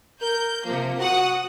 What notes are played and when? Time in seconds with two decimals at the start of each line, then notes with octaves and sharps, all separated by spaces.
0.22 A#4 G6
0.65 C3 F3 A#3
1.00 F#4 F#5 D#6